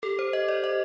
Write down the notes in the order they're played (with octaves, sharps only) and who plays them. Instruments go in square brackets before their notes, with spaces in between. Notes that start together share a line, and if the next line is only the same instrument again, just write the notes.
[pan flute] G4 [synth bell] A4
[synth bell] C5
D#5
D5
D#5